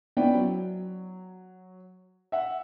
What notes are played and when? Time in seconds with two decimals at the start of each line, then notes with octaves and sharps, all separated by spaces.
0.17 B3 C#4 E4 D5 G5
0.34 F#3
2.32 E5 F#5